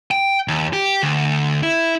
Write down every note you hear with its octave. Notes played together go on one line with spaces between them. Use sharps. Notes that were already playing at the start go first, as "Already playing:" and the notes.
G5
D#2
G4
D2
E4